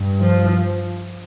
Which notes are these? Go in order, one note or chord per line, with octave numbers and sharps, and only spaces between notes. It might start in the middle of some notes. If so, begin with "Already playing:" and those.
Already playing: G2
F3